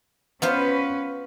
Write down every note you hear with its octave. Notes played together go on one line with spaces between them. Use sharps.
B3 C#4 F4 B4 C5